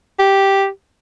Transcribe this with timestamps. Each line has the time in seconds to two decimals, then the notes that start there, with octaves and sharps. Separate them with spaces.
0.19 G4